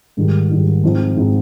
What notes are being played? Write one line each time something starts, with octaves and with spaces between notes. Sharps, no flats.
G#2 D#3 G3
G#2 D#3 G3
G#2 F3 C4 D#4
G#2 F3 C4 D#4